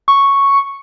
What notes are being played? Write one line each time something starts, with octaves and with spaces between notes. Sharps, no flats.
C#6